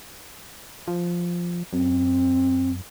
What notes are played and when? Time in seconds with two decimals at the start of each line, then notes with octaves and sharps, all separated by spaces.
0.88 F3
1.73 F#2 C4